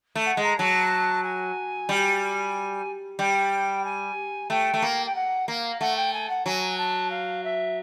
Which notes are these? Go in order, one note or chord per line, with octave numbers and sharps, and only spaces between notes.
A3
F#5
G#3
A#5
F#3 A5
G#5
G3
G3 G5
G#5
A3 G5
A3
A#3
G5
F#5
A#3 F5
A3 F#5
G5
G#5
F#5
F#3 G#5
A5
F5
E5